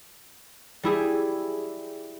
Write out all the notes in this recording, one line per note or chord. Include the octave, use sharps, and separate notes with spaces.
G3 E4 G#4